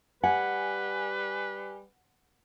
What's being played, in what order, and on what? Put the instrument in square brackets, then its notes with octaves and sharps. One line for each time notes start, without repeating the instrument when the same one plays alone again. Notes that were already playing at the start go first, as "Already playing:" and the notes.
[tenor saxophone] G3 [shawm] B4 [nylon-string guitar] F#5 [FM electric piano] G#5